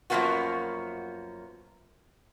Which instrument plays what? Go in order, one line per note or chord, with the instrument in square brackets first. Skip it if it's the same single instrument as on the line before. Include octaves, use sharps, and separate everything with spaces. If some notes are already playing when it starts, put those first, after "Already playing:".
[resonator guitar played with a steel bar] F#2 F3 F#3 A#3 B3 F#4